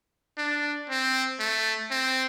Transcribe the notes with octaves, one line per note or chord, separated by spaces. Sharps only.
D4
C4
A3
C4